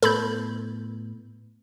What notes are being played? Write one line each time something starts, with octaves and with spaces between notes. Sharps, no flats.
A2 B3 A4 B5 G6